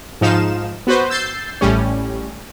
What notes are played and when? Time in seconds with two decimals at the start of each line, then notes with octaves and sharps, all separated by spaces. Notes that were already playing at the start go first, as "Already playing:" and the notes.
0.21 G#2 F3 D#4 F5 E7
0.87 B3 F#4 B4 C5
1.10 E6 G6 A6 C7
1.61 A1 A2 G3 C#4